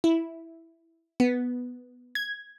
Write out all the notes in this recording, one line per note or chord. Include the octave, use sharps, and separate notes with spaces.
E4
B3
G#6